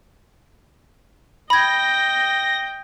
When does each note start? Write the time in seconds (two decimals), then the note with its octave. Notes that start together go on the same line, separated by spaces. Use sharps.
1.50 D#5 G5 B5 G#6 A#6